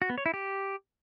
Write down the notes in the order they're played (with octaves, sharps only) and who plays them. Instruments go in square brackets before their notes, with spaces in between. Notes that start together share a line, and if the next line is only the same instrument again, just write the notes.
[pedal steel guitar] F#4
B3
C#5
E4
G4